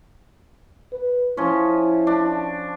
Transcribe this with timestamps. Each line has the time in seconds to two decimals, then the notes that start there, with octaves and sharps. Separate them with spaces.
0.92 B4
1.37 F3 C#4 E4
2.07 D4